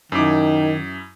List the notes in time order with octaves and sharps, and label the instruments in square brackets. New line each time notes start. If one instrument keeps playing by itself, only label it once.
[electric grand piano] F#2 E4 D6 [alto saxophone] D#3